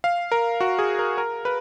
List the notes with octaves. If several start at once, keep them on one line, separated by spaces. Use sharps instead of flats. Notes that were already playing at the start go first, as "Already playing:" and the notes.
F5
A#4
F#4
G#4
A#4
A#4
B4